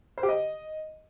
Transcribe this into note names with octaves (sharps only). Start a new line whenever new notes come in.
C5
G4
D#5